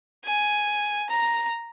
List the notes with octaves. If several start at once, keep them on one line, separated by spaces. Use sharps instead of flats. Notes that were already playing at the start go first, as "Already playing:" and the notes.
G#5
A#5